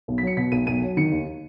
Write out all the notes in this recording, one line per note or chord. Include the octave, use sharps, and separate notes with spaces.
B1
B6
F#3 C#7
B2 B6
B1 D#7
B1 D#7
F#3
D#3 C#7
D#2